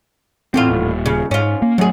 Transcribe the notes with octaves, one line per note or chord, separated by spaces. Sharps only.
E2 A2 C4 F4
D#1
C#3
G#2 C#4 F4
A#3
F#2 F#3 A3 G#4